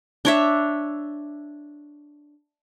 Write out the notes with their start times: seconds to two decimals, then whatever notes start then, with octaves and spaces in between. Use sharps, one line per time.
0.25 D4 C#5 E5